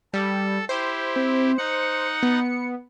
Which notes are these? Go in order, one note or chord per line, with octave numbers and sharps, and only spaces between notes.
G3 A4
E4 G4 C5
C4
D#4 F#5 C#7
B3